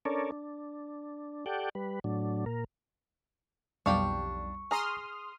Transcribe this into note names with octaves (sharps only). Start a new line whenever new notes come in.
C#4 D4 A4 A#4 C#5 D5
D4
G4 A4 D5 F#5 G5
G3 B4
A2 F#3 D4
A#2 A#4
B1 F2 G3 D4 F5 G5 C#6
G#4 A#5 C6 D#6 F6